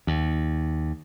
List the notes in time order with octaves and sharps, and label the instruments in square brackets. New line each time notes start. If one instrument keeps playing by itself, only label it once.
[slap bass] D#2